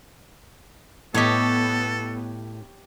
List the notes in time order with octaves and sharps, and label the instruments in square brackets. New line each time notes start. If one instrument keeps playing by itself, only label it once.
[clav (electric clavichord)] A2 D#5 [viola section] B3 [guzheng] G4 C#5 [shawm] A4